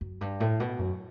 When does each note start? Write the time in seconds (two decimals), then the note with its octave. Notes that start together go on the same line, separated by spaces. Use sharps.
0.01 F#2
0.21 G2
0.40 A2
0.60 B2
0.79 F#2